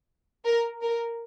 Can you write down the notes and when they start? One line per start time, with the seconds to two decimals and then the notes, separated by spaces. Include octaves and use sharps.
0.45 A#4
0.82 A#4